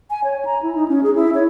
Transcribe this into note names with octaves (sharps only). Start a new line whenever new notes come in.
G#5
C#5
A#5
E4
D#4
C#4
G#4
E4
C#5